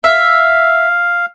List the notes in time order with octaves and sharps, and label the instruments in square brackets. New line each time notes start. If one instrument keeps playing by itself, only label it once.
[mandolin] E5 [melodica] F5